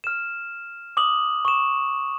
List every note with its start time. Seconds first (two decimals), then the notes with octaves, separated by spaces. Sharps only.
0.04 F6 E7
0.97 D6 D#6 F#7
1.45 C#6 E7